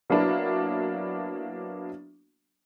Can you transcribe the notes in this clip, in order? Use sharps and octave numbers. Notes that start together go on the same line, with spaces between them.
F#3 A#3 B3 D4 E4 F#4